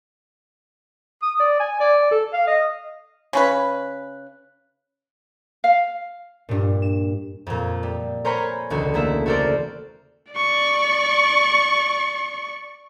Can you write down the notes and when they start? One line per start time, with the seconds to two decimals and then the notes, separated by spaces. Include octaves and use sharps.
1.22 D#6
1.40 D5
1.60 G#5
1.80 D5
2.11 A4
2.33 F5
2.47 D#5
3.33 C#3 C#4 B4
5.64 F5
6.49 G2 A#2
6.82 E7
7.47 F2 A#2
7.83 G3
8.25 A#4 C5 C#5 G#5 A#5 B5
8.70 E1 C#2 D3 F#4
8.94 A3 A#3 E4 E5
9.26 F#4 A4 A#4 C5 D5
10.33 D5 C#6